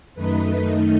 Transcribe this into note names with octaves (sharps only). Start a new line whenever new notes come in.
F#2 D#3 A3 D#4 B4